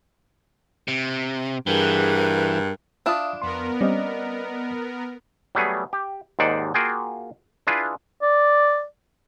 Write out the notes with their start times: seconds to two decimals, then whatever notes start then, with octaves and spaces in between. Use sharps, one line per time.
0.88 C3
1.67 G2 E3 G#4 A#4 F#5
3.06 D4 E4 F4 E5 F5 D#6
3.42 F2 B3 A#4 C6
3.81 G3 C4 C#4 D5 D#5
5.55 F#3 G3 A3 B3 G#4
5.93 G4
6.39 D#2 G#2 D#3 C5 D5 F#5
6.74 A#3 F4 F#4 G#4 G5
7.67 D4 E4 F4 G#4 B4
8.22 D5